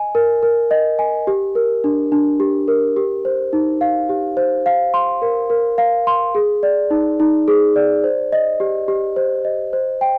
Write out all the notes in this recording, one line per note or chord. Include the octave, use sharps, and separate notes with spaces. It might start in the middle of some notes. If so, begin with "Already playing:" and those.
Already playing: D#5 G#5
A#4
A#4
D#5
G#5
G4
A#4
D4
D4
G4
A#4
G4
C5
D#4
F5
G4
C5
F5
C6
A#4
A#4
F5
C6
G#4
D5
D#4
D#4
G#4
D5
C5
D#5
G4
G4
C5
D#5
C5
G5